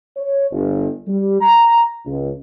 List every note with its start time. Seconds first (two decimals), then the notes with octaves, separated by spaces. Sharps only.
0.17 C#5
0.51 G1
1.07 G3
1.41 A#5
2.06 C#2